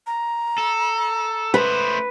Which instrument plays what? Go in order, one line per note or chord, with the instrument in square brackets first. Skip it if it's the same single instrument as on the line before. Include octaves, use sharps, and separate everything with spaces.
[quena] A#5
[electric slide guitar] A4
[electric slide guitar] A3 C5 [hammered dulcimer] B4